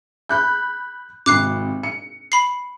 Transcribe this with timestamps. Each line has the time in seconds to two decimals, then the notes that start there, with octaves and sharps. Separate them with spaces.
0.29 B5 F#6 G6
1.26 G#1 C3 D6 F#6 C7
1.83 C#7
2.32 B5 C7